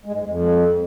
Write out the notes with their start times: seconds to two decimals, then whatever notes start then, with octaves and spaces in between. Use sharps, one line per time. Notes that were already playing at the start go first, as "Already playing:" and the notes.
0.06 G#3
0.12 G#2
0.19 G#3
0.26 F2